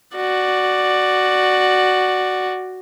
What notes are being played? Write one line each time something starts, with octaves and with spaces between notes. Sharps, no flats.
F#4 D5